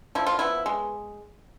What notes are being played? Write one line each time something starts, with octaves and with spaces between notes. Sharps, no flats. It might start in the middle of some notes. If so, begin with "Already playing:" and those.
F3 E4
F4
B3 E4
G#3